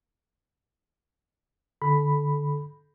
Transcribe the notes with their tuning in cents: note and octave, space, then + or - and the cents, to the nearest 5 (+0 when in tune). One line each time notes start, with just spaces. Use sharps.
D3 +0 A4 -25 B5 +0